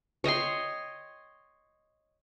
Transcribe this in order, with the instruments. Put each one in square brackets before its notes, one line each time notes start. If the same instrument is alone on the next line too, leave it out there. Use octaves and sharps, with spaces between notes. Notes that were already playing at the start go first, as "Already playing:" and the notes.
[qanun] C#5 D#5 G5 C6